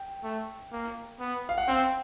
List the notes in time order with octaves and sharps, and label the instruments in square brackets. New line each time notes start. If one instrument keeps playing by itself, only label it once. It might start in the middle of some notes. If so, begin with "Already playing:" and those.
Already playing: [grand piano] G5
[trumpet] A3
A#3
B3
[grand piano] F5
F#5
[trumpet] C4 [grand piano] G5